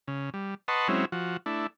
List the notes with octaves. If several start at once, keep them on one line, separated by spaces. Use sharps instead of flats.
C#3
G3
B4 D#5 F#5 A5 C6 C#6
F#3 G#3 C4 C#4 E4
F3 F#4
A3 D4 E4